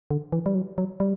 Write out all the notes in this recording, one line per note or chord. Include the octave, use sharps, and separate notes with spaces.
D3
E3
G3
F#3
F#3
G3